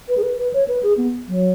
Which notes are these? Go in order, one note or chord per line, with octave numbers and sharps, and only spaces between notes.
B4
G#4
B4
B4
C#5
B4
G#4
B3
F#3